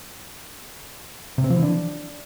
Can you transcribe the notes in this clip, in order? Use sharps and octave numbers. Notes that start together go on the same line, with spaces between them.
C3
C4
F3
E3
D4